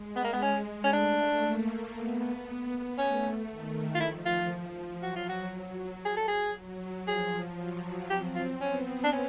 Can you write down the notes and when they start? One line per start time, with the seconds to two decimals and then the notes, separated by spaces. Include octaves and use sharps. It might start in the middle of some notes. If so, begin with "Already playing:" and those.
Already playing: G#3
0.16 B3
0.24 A#3
0.33 B3
0.42 G#3 C#4
0.84 C#4
0.93 A3 D4
1.44 A#3
1.95 B3
2.98 A3 C#4
3.50 D#3
3.95 F4
4.00 F3 E4
4.26 F4
5.02 F#3 F#4
5.16 F4
5.29 F#4
6.05 G#4
6.17 A4
6.28 G#4
6.56 F#3
7.08 F3 G#4
7.59 F#3
8.10 C4 G4
8.36 F4
8.61 B3 C#4
9.04 D4
9.12 C#4